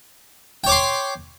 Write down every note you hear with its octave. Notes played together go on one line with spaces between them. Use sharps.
C#5 G5 C6 D6